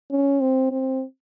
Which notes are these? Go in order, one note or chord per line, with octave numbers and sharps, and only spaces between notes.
C#4
C4
C4